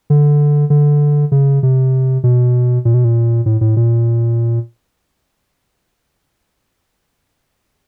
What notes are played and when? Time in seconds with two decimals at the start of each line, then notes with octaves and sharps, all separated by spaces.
0.10 D3
0.70 D3
1.32 C#3
1.63 C3
2.24 B2
2.85 A#2
2.94 B2
3.04 A#2
3.46 A2
3.61 A2
3.76 A#2